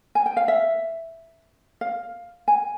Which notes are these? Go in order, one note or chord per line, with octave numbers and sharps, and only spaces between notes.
G#5
G5
F5
E5
F5
G#5